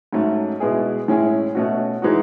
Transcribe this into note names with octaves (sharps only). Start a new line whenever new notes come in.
G#2 F#3 A3 C#4
B2 G#3 B3 E4 G#4
A2 G#3 C#4 E4 G#4
B2 A3 C#4 F#4
E3 G#3 D#4 F#4